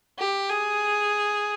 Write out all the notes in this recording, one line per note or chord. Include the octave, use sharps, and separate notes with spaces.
G4
G#4